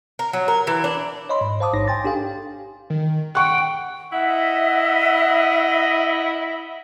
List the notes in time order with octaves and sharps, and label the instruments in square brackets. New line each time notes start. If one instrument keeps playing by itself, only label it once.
[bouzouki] A#4
F#3
A#4
E3
D4
[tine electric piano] C#5 D#5 B5 C6
G#2
C5 F5 A5 D6 D#6
A1 G#2 D#4 C#5 A#6
G5 G#5 C6 A6
D4 G4 A4 F5 G5
[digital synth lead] D#3
[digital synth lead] F#5 [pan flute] G5 [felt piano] C#6 F#6
[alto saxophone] E4 [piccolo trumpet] D#5 [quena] E5 [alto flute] F#5